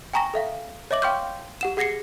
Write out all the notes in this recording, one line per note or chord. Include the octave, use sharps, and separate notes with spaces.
G5 G#5 A#5 C#6 A#6
A4 E5 F5
C#5 D#5 E5 D6 F#7
F5 G5 C6 C#6 F6 G6
G4 F#5 E7
G#4 F#5 G#6 A#6 C7 C#7